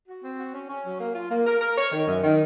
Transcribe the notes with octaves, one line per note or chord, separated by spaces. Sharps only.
F#4
C4
F#4
C#4
C#4
F#3
A#3
F4
A#3
A#4
A#4
C#5
D#3
F#2
D#3